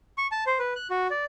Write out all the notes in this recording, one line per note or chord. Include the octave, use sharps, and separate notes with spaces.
C#6
A5
C5
B4
F#6
F#4
D5